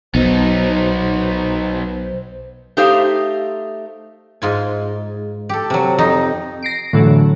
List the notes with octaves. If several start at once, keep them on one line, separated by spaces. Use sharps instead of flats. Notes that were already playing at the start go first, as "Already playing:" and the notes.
B1 B3 D#4 C5
A3 D#4 G4 C5 E5 F5
G#2 F4 G#5
G4 A4
C3 F#3
F2 D#4
A#6 C7 D7
A2 D3 E3 F#3 A3